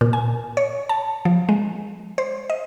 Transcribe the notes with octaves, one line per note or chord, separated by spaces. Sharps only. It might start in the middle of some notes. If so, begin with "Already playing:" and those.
A#2
G#5
C#5
A5
F3
G#3
C5
D#5